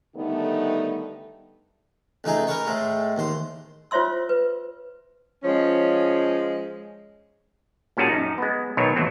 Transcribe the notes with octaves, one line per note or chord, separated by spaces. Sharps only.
D3 D#3 G3 A3 B3 D#4
C#2 A3 D#4 G#4
A#4 B4 C#5
A2 G#3 A3
D#2 C5
F4 C5 C#5 E5 C6 E6
B4
F3 G#3 C#4
A#2 G3 C#4 F#4 G#4 A5
F#2 D#4
G#3 B3
B1 B2 D#3 F#3 C#5
D#2 A2 E3 F#3 C4